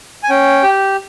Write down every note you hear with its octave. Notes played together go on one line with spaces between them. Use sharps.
G#5
C#4 G5
G4